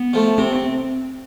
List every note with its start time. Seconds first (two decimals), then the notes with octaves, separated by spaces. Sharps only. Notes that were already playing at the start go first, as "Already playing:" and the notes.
Already playing: B3
0.13 F3 A3
0.38 C3 C4
0.55 C4